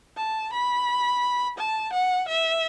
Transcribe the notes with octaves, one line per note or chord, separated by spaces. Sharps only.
A5
B5
A5
F#5
E5